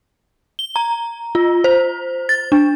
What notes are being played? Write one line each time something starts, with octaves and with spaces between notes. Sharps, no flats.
G7
A#5
F4
C5
A6
D4